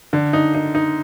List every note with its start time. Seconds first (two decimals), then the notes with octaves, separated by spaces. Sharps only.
0.13 D3
0.33 D#4
0.54 D#4
0.75 D#4